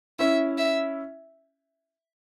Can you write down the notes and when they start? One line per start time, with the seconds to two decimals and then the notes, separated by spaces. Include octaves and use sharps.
0.19 C#4 E4 E5
0.58 E5